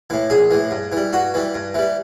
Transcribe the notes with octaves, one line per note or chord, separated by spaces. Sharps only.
A2 E3
A#1 G#4
A2 E3
G2
E3 G3
G2 F#4
E3 G3
G2
E3 G3